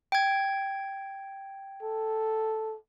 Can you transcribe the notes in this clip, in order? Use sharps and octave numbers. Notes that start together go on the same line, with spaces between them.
G5 G#6
A4